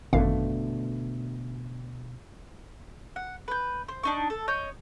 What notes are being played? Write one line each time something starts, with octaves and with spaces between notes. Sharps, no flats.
G#1 F#2 B2 D3 A3 F5
F#5
B4 G6
C5
D4 D#4 C#6
A4
C#5 D#5 G6